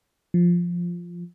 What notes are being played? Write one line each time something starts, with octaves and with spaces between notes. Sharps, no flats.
F3